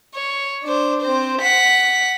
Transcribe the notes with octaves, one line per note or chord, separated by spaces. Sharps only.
C#5
D4 C5
C4 C5
F#5 B6